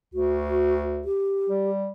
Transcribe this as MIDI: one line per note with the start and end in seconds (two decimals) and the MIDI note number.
0.14 1.05 38
0.14 0.82 66
1.05 1.70 67
1.50 1.90 55